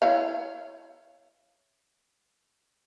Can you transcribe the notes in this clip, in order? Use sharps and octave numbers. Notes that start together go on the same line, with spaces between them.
E4 C#5 F5